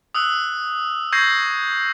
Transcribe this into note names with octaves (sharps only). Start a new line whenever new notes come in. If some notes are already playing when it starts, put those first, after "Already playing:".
D#6 E6 F#6
C#6 E6 G6 G#6 A#6 C7